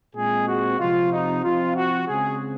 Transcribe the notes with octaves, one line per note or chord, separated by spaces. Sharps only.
A#2 G#3 C4 G#4
F#4
C3 F3 C4 F4
D#4
F3 C4 F4
F#4
C#3 G#3 C4 G#4